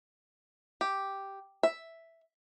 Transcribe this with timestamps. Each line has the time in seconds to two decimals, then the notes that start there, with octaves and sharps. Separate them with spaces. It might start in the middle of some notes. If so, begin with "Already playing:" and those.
0.81 G4
1.63 E5